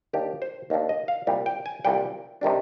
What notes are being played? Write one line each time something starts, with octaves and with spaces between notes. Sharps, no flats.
D#2 D#3 A#3 D4 G4
C5
D#2 D#3 A#3 D4
D#5
F5
C2 A#2 G3
G5
G#5
C2 A#2 G3 G5
C3 D#3 G3 D4